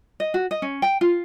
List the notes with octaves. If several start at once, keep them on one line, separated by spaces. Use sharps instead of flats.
D#5
F#4
D#5
C#4
G5
F4